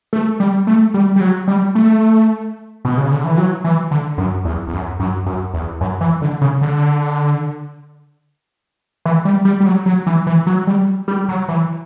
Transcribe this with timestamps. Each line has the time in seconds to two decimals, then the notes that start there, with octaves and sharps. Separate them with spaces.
0.13 A3
0.40 G3
0.67 A3
0.94 G3
1.16 G3
1.21 F#3
1.47 G3
1.75 A3
2.85 B2
2.97 C#3
3.11 D3
3.24 E3
3.38 F#3
3.64 E3
3.91 D3
4.18 F#2
4.45 E2
4.68 E2
4.73 F#2
5.00 F#2
5.26 F#2
5.54 E2
5.81 F#2
6.01 E3
6.22 D3
6.41 C#3
6.61 D3
9.05 E3
9.25 G3
9.45 G3
9.60 G3
9.66 F#3
9.86 F#3
10.07 E3
10.27 E3
10.47 F#3
10.67 G3
11.08 G3
11.29 F#3
11.48 E3